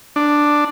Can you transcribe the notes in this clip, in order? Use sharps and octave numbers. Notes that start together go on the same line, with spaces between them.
D4